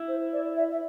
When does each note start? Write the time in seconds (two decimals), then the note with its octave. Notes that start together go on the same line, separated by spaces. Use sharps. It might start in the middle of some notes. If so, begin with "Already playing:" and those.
Already playing: E4
0.08 C5
0.33 D5
0.57 E5
0.71 E5